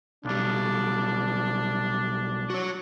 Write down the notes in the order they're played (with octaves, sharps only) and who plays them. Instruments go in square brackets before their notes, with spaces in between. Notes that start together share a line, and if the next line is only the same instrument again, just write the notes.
[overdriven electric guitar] B1 G3 [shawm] D4
[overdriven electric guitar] F#4 C#5